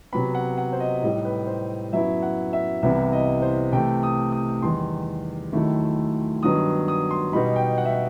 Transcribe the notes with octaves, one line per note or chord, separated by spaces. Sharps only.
C3 F#3 B3 B5
F#5
F#5
C5
D#5
A2 G3 D#4 D#5
B4
C5
F#2 F#3 B3 E4 E5
F#5
E5
C2 C3 E3 B3 E4 E5
D#5
C5
C3 E3 A3 G5
D#6
D#6
E2 D#3 G3 C6
D#2 D#3 F#3 A3 E4
G2 D#3 F#3 B3 D#6
D#6
C6
B2 G3 D#4 B5
G5
F#5
E5
F#5